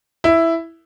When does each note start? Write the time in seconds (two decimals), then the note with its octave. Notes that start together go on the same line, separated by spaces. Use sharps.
0.24 E4